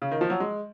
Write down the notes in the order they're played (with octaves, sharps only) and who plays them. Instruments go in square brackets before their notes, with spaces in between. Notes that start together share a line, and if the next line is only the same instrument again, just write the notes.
[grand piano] C#3
D#3
F3
F#3
G#3